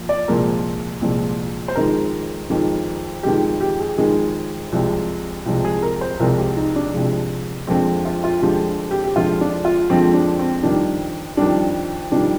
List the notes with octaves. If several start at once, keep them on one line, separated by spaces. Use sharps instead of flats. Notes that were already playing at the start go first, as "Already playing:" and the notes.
Already playing: A#2 F3
D5
C2 A#2 F3 G#3 A#4
C2 A#2 F3 G#3
C5
F2 D#3 G#3 A#4
F2 D#3 G#3
F2 D#3 G#3 G4
G4
G#4
F2 D#3 G#3 G#4
C2 C3 F3 G#3
C2 C3 F3 G#3 G4
G#4
A#4
C5
C2 C3 F3 G#3 A#4
G4
D#4
D4
C2 C3 F3 G#3
F2 D3 F3 G#3 C4
F4
F4
F2 D3 F3 G#3 G4
G4
G4
F2 D3 F3 G#3 F4
D4
F4
F2 D3 F3 G#3 C4
D4
C4
F2 D#3 G3 D4
F2 D#3 G3 D4
F2 D#3 G3 D4